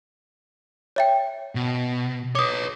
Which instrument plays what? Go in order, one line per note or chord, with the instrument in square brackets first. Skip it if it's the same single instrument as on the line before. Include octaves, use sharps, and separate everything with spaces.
[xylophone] C#5 E5 G5
[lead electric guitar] B2
[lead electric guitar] B4 C#5 [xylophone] D6 D#6